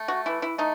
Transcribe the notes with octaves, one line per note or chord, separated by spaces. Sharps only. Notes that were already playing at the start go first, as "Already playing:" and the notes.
Already playing: A3
F#4
E3 E4
E4
A3 D#4